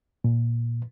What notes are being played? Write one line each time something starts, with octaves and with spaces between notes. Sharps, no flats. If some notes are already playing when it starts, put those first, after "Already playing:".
A#2